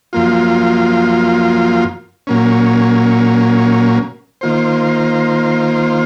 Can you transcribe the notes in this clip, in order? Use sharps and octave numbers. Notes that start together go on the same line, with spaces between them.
F#2 F3 A#3 F4
A#2 F#3 A#3 C#4
D#3 A#3 F4 C5